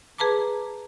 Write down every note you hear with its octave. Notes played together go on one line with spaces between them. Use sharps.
G#4 B4 A5 A#5 D6